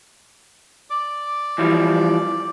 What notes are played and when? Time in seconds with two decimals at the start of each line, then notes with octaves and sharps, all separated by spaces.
0.90 D5 D6
1.58 E3 F3 G3